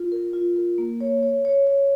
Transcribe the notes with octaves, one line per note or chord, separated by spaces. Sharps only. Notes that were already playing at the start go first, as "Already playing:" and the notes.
Already playing: F4
A#4
F4
A#4
A#3
C#5
C#5
C#5
C#5